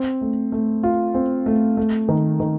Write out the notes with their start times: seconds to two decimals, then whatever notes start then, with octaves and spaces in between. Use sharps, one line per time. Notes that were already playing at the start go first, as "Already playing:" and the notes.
Already playing: C4
0.21 A3
0.52 A3
0.83 F4
1.14 C4
1.46 A3
1.77 A3
2.09 D#3
2.40 D#3